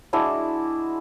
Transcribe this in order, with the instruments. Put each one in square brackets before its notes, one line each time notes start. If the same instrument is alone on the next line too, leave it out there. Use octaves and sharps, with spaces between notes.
[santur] G#3 D4 E4 F#4